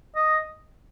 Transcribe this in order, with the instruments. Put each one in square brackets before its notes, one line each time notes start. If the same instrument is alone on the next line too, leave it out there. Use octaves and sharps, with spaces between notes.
[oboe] D#5